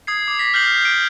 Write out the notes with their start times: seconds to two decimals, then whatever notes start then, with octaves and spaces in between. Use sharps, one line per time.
0.07 D#6 G#6 C7
0.28 D6
0.39 D6 A#6 B6
0.54 F6 G6 C7 F#7
0.67 F6
0.85 D7